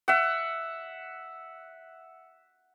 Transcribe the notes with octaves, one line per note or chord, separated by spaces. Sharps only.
E5 F#5